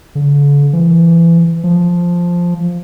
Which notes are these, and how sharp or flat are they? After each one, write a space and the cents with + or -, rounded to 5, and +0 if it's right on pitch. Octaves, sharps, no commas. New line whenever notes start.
D3 -45
E3 +30
F3 +0